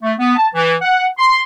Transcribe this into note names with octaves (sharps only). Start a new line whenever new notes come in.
A3
B3
A5
E3
F#5
C6